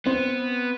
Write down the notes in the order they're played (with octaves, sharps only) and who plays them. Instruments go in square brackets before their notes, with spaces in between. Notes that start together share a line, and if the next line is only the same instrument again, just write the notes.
[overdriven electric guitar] B3 [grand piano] C4